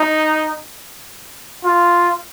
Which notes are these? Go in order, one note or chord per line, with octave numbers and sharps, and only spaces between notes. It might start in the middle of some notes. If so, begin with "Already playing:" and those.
Already playing: D#4
F4